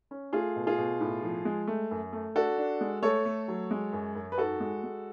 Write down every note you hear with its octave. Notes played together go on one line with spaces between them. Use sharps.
C#4
A3 F4 G#4
B2
F4 G#4
B2
A2
F3
G#3
A3
F#2
A3
D4 F#4 A4
D4
G#3
A3 A4 C#5
A3
F#3
G#3
F#2
F#2
B4
G#2 F#4 A4
G#3
G#3